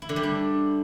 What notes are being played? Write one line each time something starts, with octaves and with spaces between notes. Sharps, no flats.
E4
D3
G3
D4